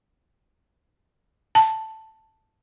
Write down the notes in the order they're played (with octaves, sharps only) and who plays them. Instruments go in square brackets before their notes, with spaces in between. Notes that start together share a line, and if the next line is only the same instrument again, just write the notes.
[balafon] A5